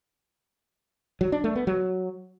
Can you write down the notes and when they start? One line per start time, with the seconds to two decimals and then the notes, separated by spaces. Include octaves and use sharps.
1.21 F#3
1.32 D4
1.44 A3
1.55 B3
1.67 F#3